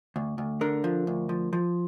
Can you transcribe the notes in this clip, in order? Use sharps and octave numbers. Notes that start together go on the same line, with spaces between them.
D2
D2
D3 A#4
F3
D2
F3
F3